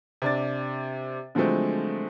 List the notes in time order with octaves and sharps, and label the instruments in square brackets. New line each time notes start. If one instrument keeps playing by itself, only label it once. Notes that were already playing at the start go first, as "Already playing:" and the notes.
[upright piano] C3 D4 A6
D3 F3 F#3 G#3 A3 C4